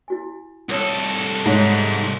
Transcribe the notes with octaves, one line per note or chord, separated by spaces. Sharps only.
E4 F#4 G#5
C2 E4 A4 C#5 D#6
G#2 C#5 E5